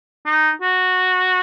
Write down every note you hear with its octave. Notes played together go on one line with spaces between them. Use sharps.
D#4
F#4